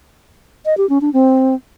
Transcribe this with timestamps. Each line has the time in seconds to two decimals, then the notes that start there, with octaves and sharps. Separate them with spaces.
0.66 D#5
0.77 G4
0.89 C#4
1.01 D4
1.13 C4